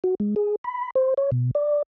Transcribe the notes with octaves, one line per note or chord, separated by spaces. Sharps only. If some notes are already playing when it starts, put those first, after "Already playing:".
F#4
G#3
G#4
B5
C5
C#5
B2
D5